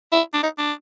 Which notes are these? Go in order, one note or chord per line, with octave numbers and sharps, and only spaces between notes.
E4
D4
D#4
D4